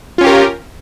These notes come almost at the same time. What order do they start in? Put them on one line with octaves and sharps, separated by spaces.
F4 C#4 G4 A#4